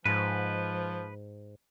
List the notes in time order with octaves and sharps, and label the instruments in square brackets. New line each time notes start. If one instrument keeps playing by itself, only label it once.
[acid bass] G#2 [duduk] F3 [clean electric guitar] B4